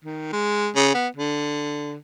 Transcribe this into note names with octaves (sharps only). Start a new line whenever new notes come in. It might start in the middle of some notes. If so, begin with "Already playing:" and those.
D#3
G#3
C#3
B3
D3